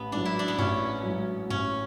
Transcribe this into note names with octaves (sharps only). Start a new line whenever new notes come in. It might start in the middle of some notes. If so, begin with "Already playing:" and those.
Already playing: A1 B3
G#2 F#3 D4
E4
D4
B3
A1 C#4
G#2 F#3
A1 C#4